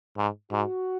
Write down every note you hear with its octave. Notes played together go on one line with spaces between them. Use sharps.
G#2
G#2 F#4